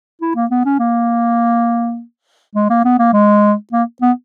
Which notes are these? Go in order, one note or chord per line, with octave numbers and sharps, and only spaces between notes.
E4
A#3
B3
C#4
A#3
G#3
A#3
B3
A#3
G#3
A#3
B3